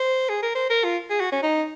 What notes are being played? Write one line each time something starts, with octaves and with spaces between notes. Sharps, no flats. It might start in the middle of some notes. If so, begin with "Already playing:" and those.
Already playing: C5
G#4
A#4
C5
A#4
F4
G#4
F#4
C#4
D#4